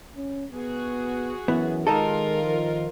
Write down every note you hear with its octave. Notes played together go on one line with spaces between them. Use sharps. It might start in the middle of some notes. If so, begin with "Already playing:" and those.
C#4
B3 F#4 G#4
F#2 E3 B3
D#3 G#3 D#4 F4 A4 A#4
F3